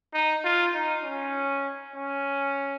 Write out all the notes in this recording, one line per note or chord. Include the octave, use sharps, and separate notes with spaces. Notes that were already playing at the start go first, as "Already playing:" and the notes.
D#4
F4
D#4
C#4
C#4